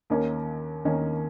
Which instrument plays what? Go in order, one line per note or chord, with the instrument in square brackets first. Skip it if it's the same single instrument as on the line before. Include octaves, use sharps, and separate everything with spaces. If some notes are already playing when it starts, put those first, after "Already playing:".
[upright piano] D#2 D#3 A#3 C#4
D#2 D#3 A#3 C#4